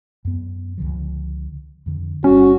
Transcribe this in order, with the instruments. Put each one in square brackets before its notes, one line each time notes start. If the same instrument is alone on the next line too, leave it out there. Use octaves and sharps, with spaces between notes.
[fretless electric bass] F#2 B3
C#2 D3 F3
F2 D3
[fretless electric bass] G1 G3 [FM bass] C#4 [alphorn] F#4